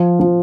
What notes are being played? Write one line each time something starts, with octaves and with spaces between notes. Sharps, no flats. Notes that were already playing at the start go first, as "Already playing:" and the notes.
Already playing: F3
F3